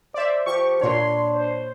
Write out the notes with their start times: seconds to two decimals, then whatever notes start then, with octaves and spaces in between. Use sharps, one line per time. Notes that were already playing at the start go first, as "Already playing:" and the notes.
0.14 C5 D5 E5
0.46 F3 G4 C#6
0.81 A#2 D4 C#5 C6
1.33 C5